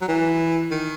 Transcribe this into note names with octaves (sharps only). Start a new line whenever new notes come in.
F#3
E3
D#3